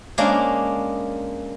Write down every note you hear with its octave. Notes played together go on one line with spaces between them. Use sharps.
G#3 A#3 C#4 D4